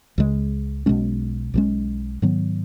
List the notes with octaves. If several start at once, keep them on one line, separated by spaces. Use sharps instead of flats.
C#2 C#3 G#3
B1 B2 G#3 C#4
B1 A#2 G#3 C#4
G#2 D#3 F#3 B3